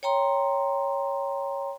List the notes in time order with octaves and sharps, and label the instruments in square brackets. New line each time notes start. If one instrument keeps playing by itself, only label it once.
[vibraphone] C#5 G5 A#5 C6